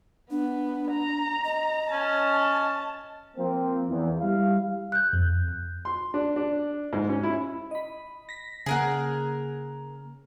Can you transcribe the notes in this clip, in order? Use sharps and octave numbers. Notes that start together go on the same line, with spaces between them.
B3 D4
A#5
D#5
C#4 A5
F3 A#3 C4
E2
G3 E4 F5
F#6 G6
F2
C6
D4
D4
G#2
C#4
E4
D#5 B5
A#6 B6
C#3 A#3 G#4 A#4 F#5